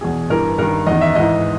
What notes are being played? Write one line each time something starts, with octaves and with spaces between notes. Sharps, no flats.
E2 B2 G#4
G2 E3 A#4
G2 D#3 A#4
E2 D#3 D#5
E5
G#2 E3 D#5